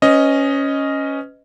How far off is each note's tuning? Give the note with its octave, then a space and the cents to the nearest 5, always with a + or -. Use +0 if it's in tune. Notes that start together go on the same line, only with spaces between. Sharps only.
C#4 +0 B4 +35 D#5 +0